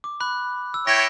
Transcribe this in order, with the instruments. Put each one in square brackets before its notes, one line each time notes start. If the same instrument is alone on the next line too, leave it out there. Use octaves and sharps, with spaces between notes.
[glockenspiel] D6
B5 F#6
E6
[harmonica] E4 C#5 G5 [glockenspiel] A#6